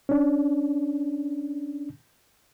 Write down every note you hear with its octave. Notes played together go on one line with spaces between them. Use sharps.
C#4 D4